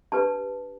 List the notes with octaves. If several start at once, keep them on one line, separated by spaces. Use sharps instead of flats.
D4 G4 B4 A5